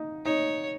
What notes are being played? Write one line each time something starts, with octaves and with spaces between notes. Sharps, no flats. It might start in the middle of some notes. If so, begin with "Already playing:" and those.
Already playing: D#4
D#4 C#5